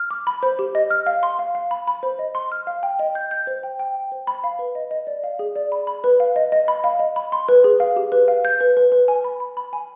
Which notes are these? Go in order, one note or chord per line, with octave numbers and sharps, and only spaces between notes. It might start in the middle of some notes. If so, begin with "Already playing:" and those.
Already playing: F6
D6
B5
C5
G4
D#5
F6
F5
C6
F5
F5
B5
B5
C5
D#5
C6
F6
F5
G5
D#5
G6
G6
C5
G5
G5
G5
C5
B5
F5
B4
D#5
D#5
D5
F5
G#4
D5
B5
B5
B4
F5
D#5
D#5
B5
F5
D#5
B5
C6
B4
G#4
F5
G4
B4
F5
G6
B4
B4
B4
G#5
B5
B5
B5
G#5